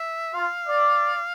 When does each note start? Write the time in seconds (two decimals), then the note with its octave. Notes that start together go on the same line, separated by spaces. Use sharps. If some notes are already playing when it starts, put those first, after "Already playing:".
Already playing: E5
0.34 F4 F5
0.68 D5